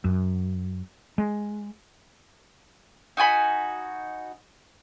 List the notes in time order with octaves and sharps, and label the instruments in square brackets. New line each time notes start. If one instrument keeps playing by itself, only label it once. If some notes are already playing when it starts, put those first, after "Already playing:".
[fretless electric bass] F#2
G#3
[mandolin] D#4 F#4 G#5 B5